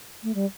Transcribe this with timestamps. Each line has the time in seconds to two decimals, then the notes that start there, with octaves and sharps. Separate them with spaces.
0.23 A3
0.34 G3